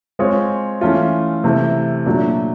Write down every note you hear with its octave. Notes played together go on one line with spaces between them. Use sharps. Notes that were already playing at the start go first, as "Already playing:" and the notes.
G#3 C4 F4 G#4 C#5
E3 A3 C#4 F4
C3 E3 A3
A#2 F#3 A3 D4 F#4